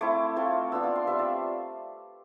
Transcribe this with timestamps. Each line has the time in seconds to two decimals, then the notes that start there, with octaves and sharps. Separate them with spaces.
0.01 A3 C4 E4 D6
0.36 A3 C4 F4
0.72 B3 D4 F4 E6
0.83 D6
0.96 C6
1.07 G3 C4 F4 E5
1.19 D5